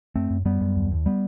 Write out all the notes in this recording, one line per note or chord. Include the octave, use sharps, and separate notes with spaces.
F#2 A3 C4
F#2
F#2 G3 B3
F#2
D#2
D#2
G3 B3